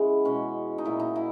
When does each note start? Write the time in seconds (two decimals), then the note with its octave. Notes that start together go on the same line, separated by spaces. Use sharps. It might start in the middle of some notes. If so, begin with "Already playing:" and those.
Already playing: C#3 E3 G#3 B3
0.25 B2 G#3 C#4
0.78 D#4
0.85 A#2 F#3 E4
1.00 D#4
1.16 E4